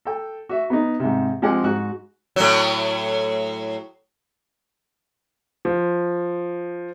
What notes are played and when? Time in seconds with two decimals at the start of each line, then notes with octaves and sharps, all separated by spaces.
0.05 A4 G5
0.49 F#4 E5
0.70 B3 D#4
1.00 G#2 C3
1.42 F3 G#3 C4 G4 F#5 G#5
1.64 G#2 F#4 F#6
2.36 A2 F#3
5.65 F3